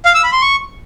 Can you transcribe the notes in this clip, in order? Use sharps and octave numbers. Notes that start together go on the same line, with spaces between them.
F5
E6
B5
C6
C#6